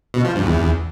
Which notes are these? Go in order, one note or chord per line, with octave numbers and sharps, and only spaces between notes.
B2
F3
G2
E2